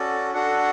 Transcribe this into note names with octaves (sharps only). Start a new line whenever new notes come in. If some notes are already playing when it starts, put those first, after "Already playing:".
Already playing: C#4 F#4 A4 D5
D4 F#4 A4 F#5